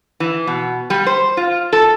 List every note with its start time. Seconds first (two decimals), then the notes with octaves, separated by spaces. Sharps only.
0.20 E3
0.47 B2
0.90 G3
1.06 C5
1.37 F4
1.73 A4